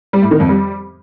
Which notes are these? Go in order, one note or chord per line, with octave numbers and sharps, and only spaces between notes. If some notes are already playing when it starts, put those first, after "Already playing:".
G3
A2
D#3
F2
G3